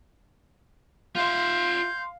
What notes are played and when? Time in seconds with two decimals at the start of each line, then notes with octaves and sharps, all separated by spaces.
1.16 F4 E5 F5 C6 G6